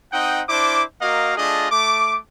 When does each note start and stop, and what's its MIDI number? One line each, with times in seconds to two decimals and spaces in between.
0.13 0.42 60
0.13 0.42 63
0.13 0.42 75
0.13 0.42 78
0.13 0.42 79
0.49 0.82 62
0.49 0.82 64
0.49 0.82 72
0.49 0.82 86
1.01 1.36 58
1.01 1.36 66
1.01 1.36 70
1.01 1.36 75
1.01 1.36 77
1.37 1.70 57
1.37 1.70 62
1.37 1.70 65
1.37 1.70 68
1.37 1.70 75
1.71 2.18 57
1.71 2.18 86